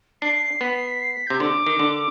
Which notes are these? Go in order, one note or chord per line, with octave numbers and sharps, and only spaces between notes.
D4 C7
B3 B6
C7
B6
C7
B6
C3 G6
D3 D6
D#3
D3